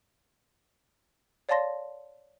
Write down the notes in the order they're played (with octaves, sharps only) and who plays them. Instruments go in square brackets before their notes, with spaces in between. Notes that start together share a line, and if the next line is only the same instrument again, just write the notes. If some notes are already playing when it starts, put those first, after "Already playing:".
[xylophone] C#5 D5 F5 A5 C6 A#6